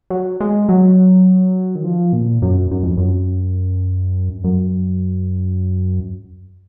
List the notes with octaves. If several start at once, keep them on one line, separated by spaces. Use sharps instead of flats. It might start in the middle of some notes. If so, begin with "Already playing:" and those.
F#3
G#3
F#3
D#3
F3
A#2
F#2
F#2
F2
F#2
F#2